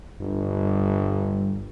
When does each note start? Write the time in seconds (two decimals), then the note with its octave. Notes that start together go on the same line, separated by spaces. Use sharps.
0.20 G1 G2